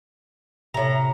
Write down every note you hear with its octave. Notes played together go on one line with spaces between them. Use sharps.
A2 C3 A#5